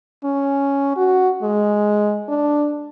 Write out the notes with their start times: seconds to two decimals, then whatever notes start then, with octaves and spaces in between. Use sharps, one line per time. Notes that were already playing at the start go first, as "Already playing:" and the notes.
0.24 C#4
0.97 F#4
1.42 G#3
2.28 D4